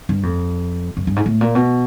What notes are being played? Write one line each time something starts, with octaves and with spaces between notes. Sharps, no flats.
G2
F2
F#2
G2
G#2
A2
A#2
B2